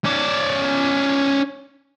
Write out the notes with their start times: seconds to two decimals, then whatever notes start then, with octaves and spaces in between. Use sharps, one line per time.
0.04 C#4 D5